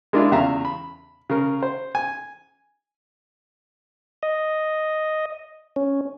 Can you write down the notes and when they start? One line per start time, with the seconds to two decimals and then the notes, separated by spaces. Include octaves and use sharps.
0.13 G#3 A#3 D4 E4 F4
0.32 E2 C#3 E5 F5 A#5
0.65 B5
1.30 C#3 A#4
1.63 C5
1.95 G#5
4.23 D#5
5.76 C#4